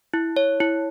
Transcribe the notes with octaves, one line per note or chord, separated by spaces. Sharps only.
E4
C#5
E4